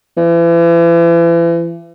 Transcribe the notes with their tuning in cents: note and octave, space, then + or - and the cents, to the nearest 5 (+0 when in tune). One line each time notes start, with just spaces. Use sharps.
E3 +40